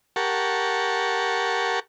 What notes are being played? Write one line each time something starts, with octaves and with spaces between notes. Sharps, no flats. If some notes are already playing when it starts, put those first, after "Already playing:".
G4 A#4 F#5 A5 C#6